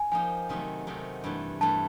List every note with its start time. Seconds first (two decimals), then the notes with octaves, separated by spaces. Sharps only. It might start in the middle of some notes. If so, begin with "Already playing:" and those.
Already playing: G#5
0.12 F3 A#3 D#4 G4 G#5
0.49 C3 D#3 F#3 A3
0.87 C3 D#3 F#3 A3
1.24 G2 E3 A3
1.61 G2 E3 A3 A5